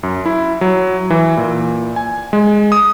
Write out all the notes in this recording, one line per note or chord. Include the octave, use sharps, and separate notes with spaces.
F#2
E4
F#3
E3
A#2
G#5
G#3
D#6